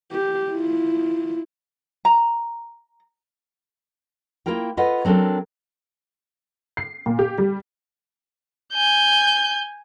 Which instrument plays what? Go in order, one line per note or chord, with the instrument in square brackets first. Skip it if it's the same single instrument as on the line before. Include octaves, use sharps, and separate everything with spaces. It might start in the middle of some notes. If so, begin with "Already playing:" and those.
[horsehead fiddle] G4
E4 F4
[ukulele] A#5
[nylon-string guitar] A#3 C4 E4 F4 A#4 G5
F4 A4 B4 D#5 F#5
F#3 C4 D4 A4 A#4
[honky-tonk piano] C7
A#2
G4
G3
[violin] G#5 G6